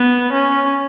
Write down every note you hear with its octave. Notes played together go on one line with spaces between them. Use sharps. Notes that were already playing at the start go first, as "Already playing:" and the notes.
Already playing: B3
C#4